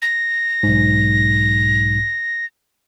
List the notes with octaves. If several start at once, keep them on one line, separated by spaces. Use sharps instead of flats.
A#6
B1 G#2